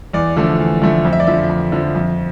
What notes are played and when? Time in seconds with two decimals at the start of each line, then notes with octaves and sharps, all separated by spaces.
0.13 E2 D5
0.37 D3 F3 A3
0.60 E2
0.82 D3 F3 A3
1.05 F2
1.13 E5
1.20 D5
1.27 D3 F3 E5
1.49 F2
1.72 D3 F3
1.95 F2